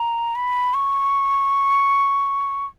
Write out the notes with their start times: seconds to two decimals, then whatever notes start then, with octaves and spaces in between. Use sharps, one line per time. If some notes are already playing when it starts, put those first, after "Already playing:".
Already playing: A#5
0.35 B5
0.74 C#6